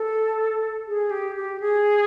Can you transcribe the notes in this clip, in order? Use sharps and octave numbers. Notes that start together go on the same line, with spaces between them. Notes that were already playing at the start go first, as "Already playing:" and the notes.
Already playing: A4
G#4
G4
G4
G#4